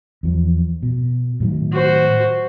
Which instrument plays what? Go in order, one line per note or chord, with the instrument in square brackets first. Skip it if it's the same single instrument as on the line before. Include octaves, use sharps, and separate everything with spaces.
[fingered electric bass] E2 F3
B2
A2 D#3 F#3
[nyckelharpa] F#4 C5